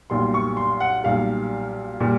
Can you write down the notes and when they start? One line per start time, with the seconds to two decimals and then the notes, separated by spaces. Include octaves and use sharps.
0.10 B1 A#2 G3 C6
0.34 C#6
0.57 C6
0.80 F#5
1.04 B1 A#2 G3 F5
2.00 A#2 G3